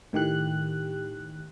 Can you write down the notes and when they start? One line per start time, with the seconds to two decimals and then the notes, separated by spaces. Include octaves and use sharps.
0.13 A2 D#3 G4 F#6